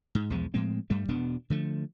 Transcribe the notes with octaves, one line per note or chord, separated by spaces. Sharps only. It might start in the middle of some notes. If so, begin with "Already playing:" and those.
G#2
B1 E2 F3 G#3
A2 F3 G#3 C4
G2 G3 A3
E1 B2 B3 D4
D3 F3 A3